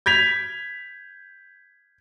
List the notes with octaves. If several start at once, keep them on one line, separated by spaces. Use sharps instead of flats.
G6 G#6 B6 F7